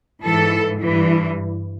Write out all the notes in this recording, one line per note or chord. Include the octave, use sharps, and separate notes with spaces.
G#2 E3 A4
G2 E3